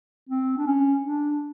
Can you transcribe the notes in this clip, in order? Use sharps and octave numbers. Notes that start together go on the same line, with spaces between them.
C4
D4
C#4
D4